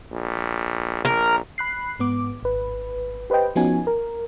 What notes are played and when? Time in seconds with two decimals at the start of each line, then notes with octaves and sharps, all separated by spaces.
0.12 A#1
1.05 A#1 A#4
1.58 B5 F#6 C7
1.99 G#2 B3 D6
2.43 G#1 B4
3.30 G4 B4 C5 D#5 G5
3.56 F3 B3 C#4 D#4 F#4 G#5
3.87 A#4